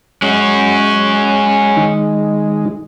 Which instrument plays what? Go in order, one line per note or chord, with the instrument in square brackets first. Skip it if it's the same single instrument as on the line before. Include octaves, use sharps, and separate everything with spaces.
[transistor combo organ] G#3 [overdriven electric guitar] C#4 F#4
[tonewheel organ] D#3 D#4